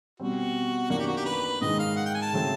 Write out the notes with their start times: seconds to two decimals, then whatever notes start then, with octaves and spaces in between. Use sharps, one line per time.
0.20 B2 G3 C4 F#4
0.90 F#2 D#3 F#3 A#3 D4 F#4
0.98 G4
1.07 F#4
1.17 G4
1.25 B4
1.61 G#2 D#3 G#3 D#5
1.79 F5
1.96 F#5
2.06 G5
2.15 G#5
2.22 A5
2.32 C#3 F#3 A3 C4